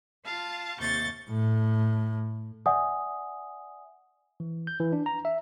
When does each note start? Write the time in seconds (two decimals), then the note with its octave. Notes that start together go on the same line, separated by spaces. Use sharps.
0.26 F4 F5 A5
0.79 D#2 C3 C#6 G6 A6
1.30 A2
2.66 D5 E5 F#5 G#5 D#6
4.40 E3
4.67 G6
4.80 E3
4.93 D4
5.06 A#5
5.25 E5